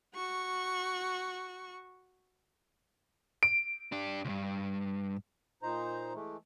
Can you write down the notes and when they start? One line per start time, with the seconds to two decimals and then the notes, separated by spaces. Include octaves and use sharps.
0.14 F#4 C#6
3.43 D7
3.92 D4 G4
4.25 C#2 G2
5.63 A#2 D#4 C5 A#5
6.14 E3 G#3 A3